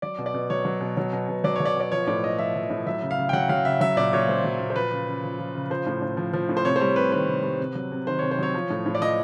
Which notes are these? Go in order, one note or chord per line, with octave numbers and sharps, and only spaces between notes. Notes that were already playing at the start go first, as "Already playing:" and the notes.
F#3 D5
B2
D5
B2
F#3 C#5
F#3
B2
F#3
B2
B2
F#3 D5
F#3 C#5
D5
B2 D5
F3 C#5
A2 D5
A2 D#5
F3 E5
F3
A2
F#3 E5
C#3
F5
C#3
G5
F#3 F#5
F#3 F5
C#3 E5
F#3 E5
A#2 D5
A#2 C#5
F#3 C5
F#3
A#2
C5
F3 B4
C#3
C#3
F3
F3
C#3
F3 C5
A2
A2
F3
F3
A2
C5
C3 C#5
C5
G3 C#5
C3 B4
D#3 B4
C3
G3
C3
F#3
C3
D#3 C5
C3 C#5
C5
F#3 C#5
F3
A2
A2
D5
F3 D#5